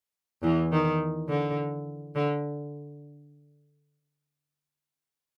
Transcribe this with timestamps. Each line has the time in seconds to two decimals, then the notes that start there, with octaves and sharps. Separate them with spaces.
0.43 E2 E3
0.72 D#3
1.29 D3
2.16 D3